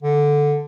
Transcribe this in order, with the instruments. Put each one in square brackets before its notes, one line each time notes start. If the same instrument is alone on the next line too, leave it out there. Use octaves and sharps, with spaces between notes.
[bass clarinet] D3